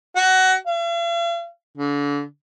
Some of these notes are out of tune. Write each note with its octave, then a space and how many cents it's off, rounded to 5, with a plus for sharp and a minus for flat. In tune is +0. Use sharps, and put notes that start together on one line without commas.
F#4 +20
F5 -45
D3 -35